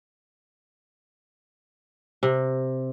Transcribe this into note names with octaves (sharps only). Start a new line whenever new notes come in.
C3